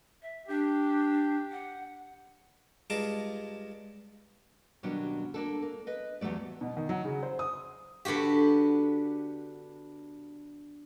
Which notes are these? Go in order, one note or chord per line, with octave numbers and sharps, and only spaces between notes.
E5
D4 G4
F#5
G2 G#3 F4 A5 A#5 D6
D#2 B2 F#3 G3 C#4 D4
A#3 D4 A4
A#3
B4 D#5
E2 F#3 G3 A3 D5
B2
D#3
F#3
C#3
C5
D#6
D3 B3 D4 F#4 G4